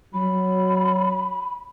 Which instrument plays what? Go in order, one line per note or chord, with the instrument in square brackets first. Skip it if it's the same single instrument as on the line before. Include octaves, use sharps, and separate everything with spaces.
[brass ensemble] F#3 [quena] B5